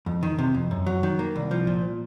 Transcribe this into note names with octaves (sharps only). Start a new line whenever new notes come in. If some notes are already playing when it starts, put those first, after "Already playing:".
F2
D#3
C3
F2
F#2
F#3
D#3
A#3
C2
F3
A#2